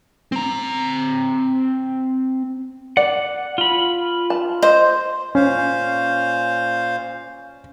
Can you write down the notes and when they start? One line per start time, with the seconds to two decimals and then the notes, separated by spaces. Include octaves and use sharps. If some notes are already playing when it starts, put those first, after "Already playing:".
0.32 C4 A#5
2.97 D5 F#5
3.58 F4 B5
4.30 A5
4.62 C5 D#5
5.35 A#2 C#4 C5 F5